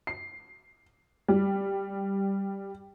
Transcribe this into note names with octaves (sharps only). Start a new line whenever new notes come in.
C7
G3